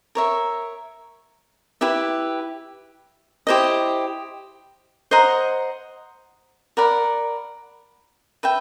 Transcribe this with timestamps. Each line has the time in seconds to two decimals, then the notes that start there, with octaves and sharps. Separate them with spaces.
0.15 A#4 C#5 E5
1.81 E4 G4 B4 E5
3.47 E4 G4 C5 D#5
5.11 C5 D#5 F#5 A#5
6.77 A#4 D5 F#5 B5
8.43 B4 E5 G5